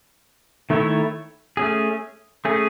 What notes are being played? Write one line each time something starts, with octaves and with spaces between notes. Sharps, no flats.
D#3 A3 E4 A4 C#5
A3 C#4 G#4
A3 C#4 G#4